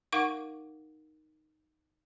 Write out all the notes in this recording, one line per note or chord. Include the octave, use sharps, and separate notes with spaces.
D#4 A#4 F5 F#5 C#6 D6